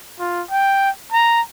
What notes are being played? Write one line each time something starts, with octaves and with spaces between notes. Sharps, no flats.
F4
G5
A#5